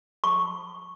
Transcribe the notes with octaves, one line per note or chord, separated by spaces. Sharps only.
C#6